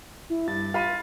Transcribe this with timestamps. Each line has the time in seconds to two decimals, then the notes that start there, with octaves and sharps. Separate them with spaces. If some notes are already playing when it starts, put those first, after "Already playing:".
0.30 E4
0.48 G2 A6
0.74 F4 B5 D#7